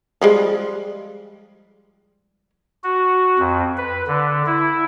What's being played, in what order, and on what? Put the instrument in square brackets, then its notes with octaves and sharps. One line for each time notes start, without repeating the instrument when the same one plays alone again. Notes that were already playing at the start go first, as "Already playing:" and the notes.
[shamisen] F3 G3 G#3
[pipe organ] F#4
F2
B4
D3
E4